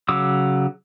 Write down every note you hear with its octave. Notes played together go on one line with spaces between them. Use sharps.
C#3 F#3 D6 E6